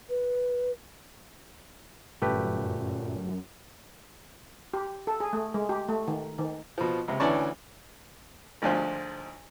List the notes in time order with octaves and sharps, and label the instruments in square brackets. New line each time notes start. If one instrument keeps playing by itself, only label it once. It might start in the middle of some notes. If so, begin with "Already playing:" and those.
[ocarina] B4
[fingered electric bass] G1 [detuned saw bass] F#2 [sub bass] A#2 [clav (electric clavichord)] A3 G4 B4
[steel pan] G4
A4
G#4
A3
G#3
G4
A3
D#3
D#3
[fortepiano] B2 F3
C#2 C3
D2 E3 C#4 D5 A5 C#6
G#1 D2 F3